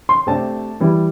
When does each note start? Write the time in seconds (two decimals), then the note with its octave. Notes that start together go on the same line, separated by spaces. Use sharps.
0.09 C6
0.27 C3 A3 D4 A5
0.80 E3 G3 E4